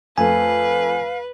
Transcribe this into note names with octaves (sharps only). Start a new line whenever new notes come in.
F2 A3 B4 F5 G#5